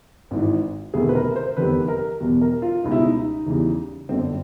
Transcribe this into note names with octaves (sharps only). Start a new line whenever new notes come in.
G#1 G#2 E3
E1 D2 C3 D#3 G#4
B4
A#4
C5
F1 E2 C3 D#3 G3 B4
A#4
E2 B2 G3
A#4
F4
C#2 B2 G3 D#4
E4
D#4
E2 C#3 E3 G3
G1 F#2 D3 C4